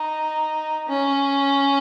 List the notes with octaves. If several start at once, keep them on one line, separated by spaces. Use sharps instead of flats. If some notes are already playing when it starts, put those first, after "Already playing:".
Already playing: D#4
C#4